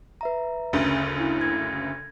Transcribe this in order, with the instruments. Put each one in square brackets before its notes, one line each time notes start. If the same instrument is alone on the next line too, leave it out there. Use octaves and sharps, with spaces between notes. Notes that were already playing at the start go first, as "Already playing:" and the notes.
[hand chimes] B4 E5 A#5
[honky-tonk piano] F#1 D2 C#3
[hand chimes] E4
G#6 A#6